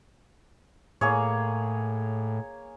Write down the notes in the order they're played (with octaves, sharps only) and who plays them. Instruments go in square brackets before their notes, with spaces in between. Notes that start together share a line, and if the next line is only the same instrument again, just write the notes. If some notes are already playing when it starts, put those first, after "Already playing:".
[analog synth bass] A2 [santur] A#3 G#4 C#5